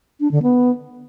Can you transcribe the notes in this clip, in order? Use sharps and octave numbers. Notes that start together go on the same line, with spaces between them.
D4
D3
B3